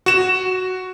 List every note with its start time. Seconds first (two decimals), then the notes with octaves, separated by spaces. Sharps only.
0.06 F#4 E7